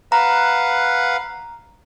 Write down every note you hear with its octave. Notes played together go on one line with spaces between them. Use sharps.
B4 F5 F#5 A#5